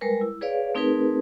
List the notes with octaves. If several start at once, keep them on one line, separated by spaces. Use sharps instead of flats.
G3 G#3 A#4 B4
E4
G#4 B4 C#5 D5 F5
A3 C4 D#4 G#4 A#4 B4